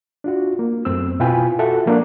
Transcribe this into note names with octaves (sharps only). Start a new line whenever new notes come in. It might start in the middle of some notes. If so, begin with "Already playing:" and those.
D4 F4 F#4
A#3
F#2 A3 B3 C4 E6
B2 E4 F4 B4 G5 G#5
F4 F#4 A4 E5 F#5
F3 G#3 A#3 B3 D4